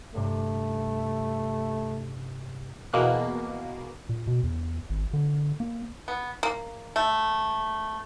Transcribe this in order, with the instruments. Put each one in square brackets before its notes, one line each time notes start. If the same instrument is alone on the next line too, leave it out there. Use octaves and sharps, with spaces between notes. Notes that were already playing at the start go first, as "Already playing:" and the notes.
[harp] G2 C3 [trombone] A3
[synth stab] E2 B2 A#3 F#6
[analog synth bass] A#2
B2
E2
G#1
D3
A#3
[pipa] B3
A#3
A3